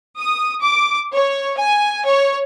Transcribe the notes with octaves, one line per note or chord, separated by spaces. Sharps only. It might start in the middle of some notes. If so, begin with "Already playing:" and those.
D#6
D6
C#5
G#5
C#5